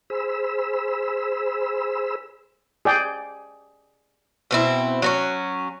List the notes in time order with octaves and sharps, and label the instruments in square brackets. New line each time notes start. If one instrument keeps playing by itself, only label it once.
[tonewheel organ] G#4 C5 B5 E6
[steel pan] G#4 D5 G5
[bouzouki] B2 C4 E4
F#3 B3 C#4